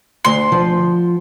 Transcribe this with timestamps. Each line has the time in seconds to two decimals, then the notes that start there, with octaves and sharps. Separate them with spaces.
0.25 D2 C6
0.52 F3